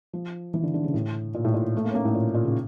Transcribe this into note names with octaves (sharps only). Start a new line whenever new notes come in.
F3
E3
D3
D3
C#3
A2
A#2
A2
A#2
A3
A#3
C#4
A#3
A2
A#2
A#2
C#3